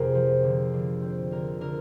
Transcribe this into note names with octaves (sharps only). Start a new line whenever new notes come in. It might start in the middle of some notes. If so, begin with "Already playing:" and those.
Already playing: F2 C3 A#3 G#4 A#4 C5
F3
D3
D3
C4
D3 A#4
D3 A#4